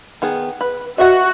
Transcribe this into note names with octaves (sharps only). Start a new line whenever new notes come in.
D#3 B3 G#4
B4
F#4 D#5 E5 F#5